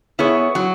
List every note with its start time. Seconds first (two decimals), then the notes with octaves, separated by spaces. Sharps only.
0.19 B3 E4 G#4 C#5
0.55 F#3